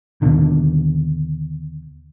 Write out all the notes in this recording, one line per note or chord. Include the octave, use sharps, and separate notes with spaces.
D#2 B2 D3 D#3